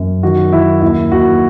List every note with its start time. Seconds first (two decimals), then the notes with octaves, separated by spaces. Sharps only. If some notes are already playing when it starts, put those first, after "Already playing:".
Already playing: F#2
0.23 D#3 F#4
0.53 D#3 E4
0.82 D#2 E4
1.12 D#2 F#4